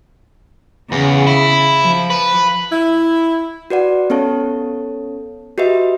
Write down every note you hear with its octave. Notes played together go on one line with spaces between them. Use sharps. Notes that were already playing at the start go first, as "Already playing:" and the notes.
E2 C#3
E4
F3
B4
E4
F#4 B4 D5 F#5
B3 C#4 A4 C#5 A5
F#4 G4 B4 D#5 E5